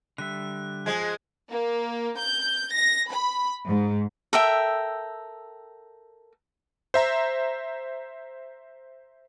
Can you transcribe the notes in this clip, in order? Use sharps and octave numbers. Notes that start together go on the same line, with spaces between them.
D3 G3 E5 F#6
F3 G#3 G#4 G#6
A#3
G6
A#6
B5
G#2
A4 A#4 E5 G5
C5 E5 A#5